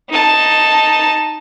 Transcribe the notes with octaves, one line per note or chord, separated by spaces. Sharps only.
D#4 A5